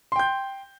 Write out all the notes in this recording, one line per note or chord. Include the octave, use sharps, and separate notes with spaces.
G5 C6 G6